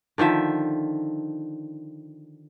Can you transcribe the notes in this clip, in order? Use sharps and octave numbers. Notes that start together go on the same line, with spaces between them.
D3 D#3 F3 E5